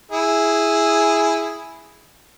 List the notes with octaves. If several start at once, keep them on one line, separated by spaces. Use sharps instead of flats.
E4 G#4